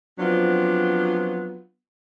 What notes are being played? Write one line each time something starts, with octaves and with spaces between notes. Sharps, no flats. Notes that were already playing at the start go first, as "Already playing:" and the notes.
F3 F#3 B3 C4 D4 F4